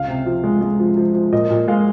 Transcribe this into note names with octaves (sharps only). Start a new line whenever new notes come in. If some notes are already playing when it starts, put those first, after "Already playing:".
Already playing: C#2 F5
C3
F3
G#3
G#3
F3
F3
F3
A#2 D#5
A#2
G#3 F5